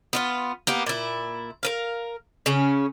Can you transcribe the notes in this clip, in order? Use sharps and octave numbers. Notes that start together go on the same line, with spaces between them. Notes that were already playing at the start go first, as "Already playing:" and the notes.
B3 E4 F4
A#3 B3 G4
A#2 E4
A#4 B4 F5
C#3 C#4